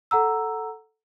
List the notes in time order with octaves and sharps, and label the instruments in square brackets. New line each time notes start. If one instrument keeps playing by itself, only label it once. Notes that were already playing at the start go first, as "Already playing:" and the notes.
[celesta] A4 F#5 A#5 E6